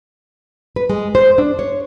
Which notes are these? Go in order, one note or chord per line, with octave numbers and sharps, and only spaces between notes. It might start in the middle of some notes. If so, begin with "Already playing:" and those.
B4
G#3
C5
D4
C#5